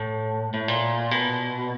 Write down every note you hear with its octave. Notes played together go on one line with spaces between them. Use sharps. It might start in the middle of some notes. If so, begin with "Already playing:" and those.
Already playing: A2
A2
A#2
B2